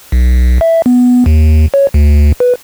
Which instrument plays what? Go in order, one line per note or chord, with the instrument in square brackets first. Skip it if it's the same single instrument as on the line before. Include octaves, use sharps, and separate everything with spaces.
[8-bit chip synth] B1
E5
B3
D#2
C#5
D2
B4